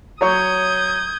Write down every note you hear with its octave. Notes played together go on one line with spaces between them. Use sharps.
F#3 C#5 C#6 D#6 G6 G#6